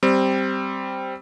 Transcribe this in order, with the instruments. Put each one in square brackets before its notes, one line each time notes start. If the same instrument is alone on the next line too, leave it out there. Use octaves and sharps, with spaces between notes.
[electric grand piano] G3 C4